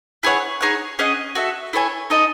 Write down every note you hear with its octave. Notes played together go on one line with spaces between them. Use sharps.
E4 G#4 C#5 F#5
D#4 G#4 C#5 F#5
C#4 G#4 D#5 F#5
F#4 A4 E5
E4 A4 C#5 G#5
D#4 A4 D#5